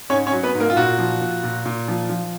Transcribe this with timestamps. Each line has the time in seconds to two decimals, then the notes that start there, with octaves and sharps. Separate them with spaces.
0.10 G#2 C#4 C#5
0.27 C#4 C#5
0.32 F#3
0.43 B3 B4
0.54 G#2
0.60 A#3 A#4
0.70 F4
0.77 A#2 F#4
0.99 F3
1.21 A#2
1.43 A#2
1.65 A#2
1.88 F3
2.09 F3